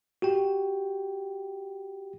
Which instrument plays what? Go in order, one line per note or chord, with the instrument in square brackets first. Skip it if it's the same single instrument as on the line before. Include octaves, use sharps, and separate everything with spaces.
[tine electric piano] F#4 G4 G5